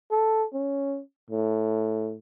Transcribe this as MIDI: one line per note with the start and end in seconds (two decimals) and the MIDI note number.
0.11 0.45 69
0.53 1.00 61
1.30 2.15 45